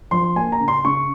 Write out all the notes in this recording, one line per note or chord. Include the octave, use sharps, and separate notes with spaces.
F3 C6
A#3 G#5
A#5
C#3
C6
C#3 C#6